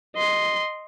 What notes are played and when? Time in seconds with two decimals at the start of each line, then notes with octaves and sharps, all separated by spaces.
0.16 D#5 C6